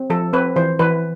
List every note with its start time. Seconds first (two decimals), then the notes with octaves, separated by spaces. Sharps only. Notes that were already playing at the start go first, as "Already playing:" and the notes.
Already playing: C4
0.10 F3 A4
0.33 C4 B4
0.56 E3 C5
0.79 E3 B4